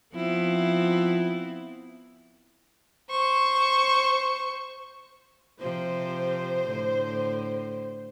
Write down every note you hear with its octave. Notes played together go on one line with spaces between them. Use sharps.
F3 B3 C4 E4
C5 C#6
C3 F3 C5
A2 D3